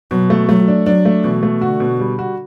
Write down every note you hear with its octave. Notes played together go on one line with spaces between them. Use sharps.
B2 F#3
A3
F#3 A3
D4
F#3 D4
A3
B2 E3
A3
D3 F#4
B2
G3
F#4